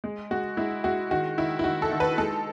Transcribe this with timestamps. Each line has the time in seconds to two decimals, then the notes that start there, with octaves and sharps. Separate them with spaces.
0.04 G#3
0.31 G#3 F#4
0.57 G#3 E4
0.84 G#3 F#4
1.11 D#3 F#4
1.38 D#3 E4
1.59 E4
1.64 D#3 F#4
1.82 A4
1.91 D#3
2.00 B4
2.18 G#3 A4